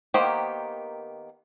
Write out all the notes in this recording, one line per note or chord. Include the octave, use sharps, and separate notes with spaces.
D#3 A#3 B3 G4 C5